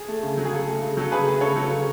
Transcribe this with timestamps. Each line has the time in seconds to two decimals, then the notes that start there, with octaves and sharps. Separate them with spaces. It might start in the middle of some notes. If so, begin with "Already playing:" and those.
Already playing: G#4
0.08 A3
0.23 C#3
0.38 F#3
0.45 G#4
0.52 C#3 A4
0.67 A3
0.82 C#3
0.97 F#3 A4
1.12 C#3 G#4 B4
1.27 A3
1.41 C#3 A4 C#5
1.56 F#3
1.71 C#3